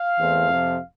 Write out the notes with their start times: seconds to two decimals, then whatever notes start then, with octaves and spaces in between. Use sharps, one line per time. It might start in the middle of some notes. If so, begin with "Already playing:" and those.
Already playing: F5
0.18 E2 E3 A3 C4
0.49 F2 C3 F3